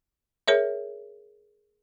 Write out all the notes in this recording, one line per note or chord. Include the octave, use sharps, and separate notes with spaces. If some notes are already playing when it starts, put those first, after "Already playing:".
G#4 A#4 C#5 E5